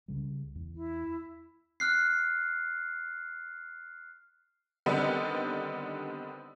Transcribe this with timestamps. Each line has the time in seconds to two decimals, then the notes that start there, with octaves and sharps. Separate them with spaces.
0.08 C#2 C#3 G3
0.55 E2
0.75 E4
1.80 F6 F#6 C7
4.86 D3 D#3 G3 B3 C4 D4